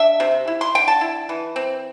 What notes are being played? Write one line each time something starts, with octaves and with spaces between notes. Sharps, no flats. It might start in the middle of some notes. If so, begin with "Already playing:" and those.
Already playing: D4 E5
C3
E4
C6
D3 G5
A5
E4
E3
C4